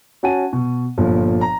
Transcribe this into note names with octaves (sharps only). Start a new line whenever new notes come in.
C#4 F#4 F#5 G#5 A5 D#7
B2
G1 A#2 F3
A#5